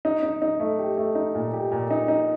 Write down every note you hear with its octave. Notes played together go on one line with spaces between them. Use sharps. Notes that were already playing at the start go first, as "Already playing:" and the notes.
D#4
D#4
D#4
A3
G4
A3
D#4
A#2
G4
A#2
D#4
D#4